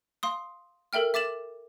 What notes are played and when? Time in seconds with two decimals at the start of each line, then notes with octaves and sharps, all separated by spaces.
0.23 F5 C6 D#6
0.93 A4 A#4 E5 G5 F6
1.14 E5 D6 A6 E7 F#7